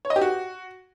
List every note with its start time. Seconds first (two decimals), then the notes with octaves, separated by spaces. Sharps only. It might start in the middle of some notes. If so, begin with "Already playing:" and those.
0.05 C#5
0.10 D#5
0.16 G4
0.21 F#4